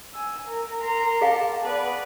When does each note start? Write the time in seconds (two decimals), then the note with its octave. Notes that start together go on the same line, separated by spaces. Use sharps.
0.14 G#5 E6
0.48 A#4
0.82 A#5 C6
1.21 G#4 F5 G5 A5
1.63 B3 B4 D5